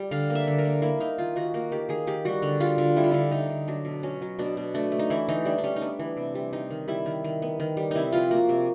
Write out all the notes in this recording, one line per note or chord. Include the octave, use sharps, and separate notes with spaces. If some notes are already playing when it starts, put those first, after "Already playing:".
Already playing: G3
D3 F5
A#3
E5
D3
A#4
A#3
A#3 E4
A#3 D#4
D#3 F4
D#3 F#4
A#3 F#4
D#3 G4
D#3 G#4
D#3 G4
G3 F#4
D3
G3 F4
D3
G3 E4
F4
D3 E4
D3 D#4
D3
F#3 D4
B2
F#3 C#4
F#3
B2 D4
B2
A3 D4
A3
D#4
E3 E4
E3 D#4
G3 D4
D4
G3 C#4
D#4
B3 D4
E3
C3
G3
G3 D#4
D#3
G3 E4
D#3
D#3
B3
D#3
G3
C3 D#4 E4
F3 F4
A#3 F#4
C3